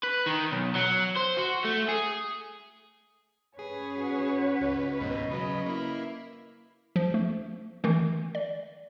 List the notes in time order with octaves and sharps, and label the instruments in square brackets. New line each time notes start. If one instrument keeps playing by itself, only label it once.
[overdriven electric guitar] B4
D#3
B1
F#3
C5
F#4
A3
G#4
[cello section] C#4 B4 [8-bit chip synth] G#4 [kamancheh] C#5
[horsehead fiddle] F#4 F#5
[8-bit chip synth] C#2
[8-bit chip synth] D#2 G#2 B2 [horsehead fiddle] D#5
[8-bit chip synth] C#3 F#3 [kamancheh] B5
[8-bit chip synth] A#3 E4
[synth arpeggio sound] F3
A3
D#3 E3 A3
D5